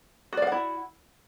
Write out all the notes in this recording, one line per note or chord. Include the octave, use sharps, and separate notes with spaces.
E4 F#4 D5 F5 F#5